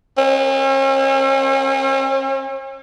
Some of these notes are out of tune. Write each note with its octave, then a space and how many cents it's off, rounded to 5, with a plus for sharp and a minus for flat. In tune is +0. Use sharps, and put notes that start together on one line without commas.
C#4 -45